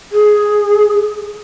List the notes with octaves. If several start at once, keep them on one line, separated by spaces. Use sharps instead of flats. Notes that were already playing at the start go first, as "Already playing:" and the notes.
G#4